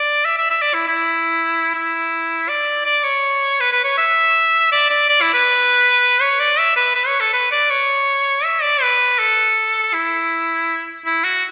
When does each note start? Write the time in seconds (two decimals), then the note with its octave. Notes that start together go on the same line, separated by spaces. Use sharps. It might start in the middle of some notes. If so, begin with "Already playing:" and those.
Already playing: D5
0.25 E5
0.38 E5
0.50 E5
0.62 D5
0.74 E4
0.88 E4
1.74 E4
2.49 D5
2.86 D5
3.04 C#5
3.61 B4
3.73 B4
3.85 C#5
3.98 E5
4.72 D5
4.90 D5
5.09 D5
5.21 E4
5.34 B4
6.21 C#5
6.40 D5
6.59 E5
6.76 B4
6.95 B4
7.07 C#5
7.21 A4
7.33 B4
7.52 D5
7.70 C#5
8.45 E5
8.63 D5
8.82 B4
9.19 A4
9.94 E4
11.06 E4
11.24 F#4